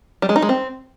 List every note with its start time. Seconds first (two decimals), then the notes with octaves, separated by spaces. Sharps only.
0.22 G3
0.29 G#3
0.36 D#4
0.42 G#3
0.49 C4